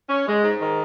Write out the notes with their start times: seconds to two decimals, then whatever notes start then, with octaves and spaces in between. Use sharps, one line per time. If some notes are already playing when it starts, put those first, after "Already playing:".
0.09 C#4
0.27 G#3
0.44 G#2
0.61 D#3